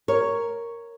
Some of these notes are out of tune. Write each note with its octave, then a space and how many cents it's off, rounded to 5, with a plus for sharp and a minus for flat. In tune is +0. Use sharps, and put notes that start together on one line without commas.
A#4 +0 C#5 +0